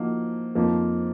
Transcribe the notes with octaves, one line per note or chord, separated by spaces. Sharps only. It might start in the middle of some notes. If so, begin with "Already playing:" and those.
Already playing: F3 A#3 D#4 F#4
F2 F3 A#3 D#4